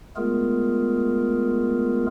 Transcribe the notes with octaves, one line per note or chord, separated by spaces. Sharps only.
G#3 A3 B3 F4 G#4 A#4